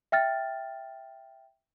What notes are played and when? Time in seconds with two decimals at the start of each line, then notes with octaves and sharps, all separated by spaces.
0.12 E5 G5 F6 A6